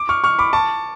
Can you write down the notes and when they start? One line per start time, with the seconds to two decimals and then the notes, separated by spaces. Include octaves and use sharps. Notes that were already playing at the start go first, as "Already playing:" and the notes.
Already playing: D6
0.09 C#6 F6
0.24 C#6 F6
0.39 B5 D6
0.53 A5 C#6